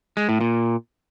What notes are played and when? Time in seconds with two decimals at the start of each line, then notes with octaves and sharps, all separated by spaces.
0.17 G#3
0.29 A2
0.41 A#2